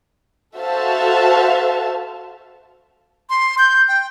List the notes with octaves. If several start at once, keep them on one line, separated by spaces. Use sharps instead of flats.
F#4 A4 C5 E5 F5 A5
C6
G6
G5